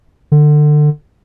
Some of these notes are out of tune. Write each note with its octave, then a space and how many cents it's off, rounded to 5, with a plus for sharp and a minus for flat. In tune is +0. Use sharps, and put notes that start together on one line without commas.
D3 +25